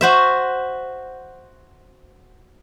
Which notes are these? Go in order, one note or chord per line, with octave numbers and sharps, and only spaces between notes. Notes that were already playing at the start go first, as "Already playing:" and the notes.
F#4 C5 E5